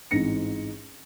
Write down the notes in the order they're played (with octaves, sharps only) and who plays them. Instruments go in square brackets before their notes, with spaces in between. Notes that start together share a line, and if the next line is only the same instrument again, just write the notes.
[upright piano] A1 G#2 C4 A#6 C#7